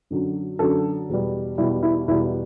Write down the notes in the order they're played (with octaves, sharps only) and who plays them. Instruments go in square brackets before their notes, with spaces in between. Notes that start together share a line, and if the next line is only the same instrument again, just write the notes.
[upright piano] F#2 D3 F#3
F#2 D3 F#3 A4
E2 B2 G3
E2 B2 G3 E4
E4
E2 B2 G3 E4